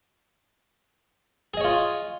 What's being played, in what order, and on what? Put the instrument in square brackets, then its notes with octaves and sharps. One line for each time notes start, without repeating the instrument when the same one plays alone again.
[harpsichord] G#4
D#5
C#5
F4